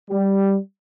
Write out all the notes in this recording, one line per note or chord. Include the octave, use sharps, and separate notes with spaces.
G3